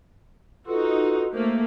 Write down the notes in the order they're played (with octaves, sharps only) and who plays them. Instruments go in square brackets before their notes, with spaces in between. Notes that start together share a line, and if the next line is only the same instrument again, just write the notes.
[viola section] D#4 F#4 [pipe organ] F4 A4 B4
[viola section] A3 A#3 [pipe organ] C5